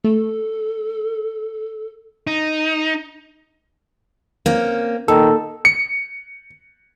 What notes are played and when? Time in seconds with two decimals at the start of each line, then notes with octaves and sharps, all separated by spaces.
0.04 A3 A4
2.27 D#4
4.46 A#3 C4 C#4
5.08 A#2 D#3 A4
5.65 C#7